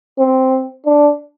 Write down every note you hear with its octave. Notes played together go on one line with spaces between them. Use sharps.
C4
D4